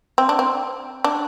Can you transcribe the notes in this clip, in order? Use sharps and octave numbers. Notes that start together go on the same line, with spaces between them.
C4
D4
C4
D4